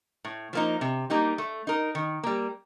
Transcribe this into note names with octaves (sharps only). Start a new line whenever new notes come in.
A2
F3 A#3 D#4
C3
G3 A#3 D#4 G4
A3
D#4 A#4
D#3
G3 A#3